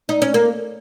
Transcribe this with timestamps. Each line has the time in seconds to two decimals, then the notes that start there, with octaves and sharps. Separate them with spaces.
0.09 D#4
0.22 C#4
0.34 A#3